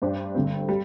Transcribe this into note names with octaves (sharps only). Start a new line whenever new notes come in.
G2 G3 D4 G4 C5
G1 G2 D3 G3 C4
G3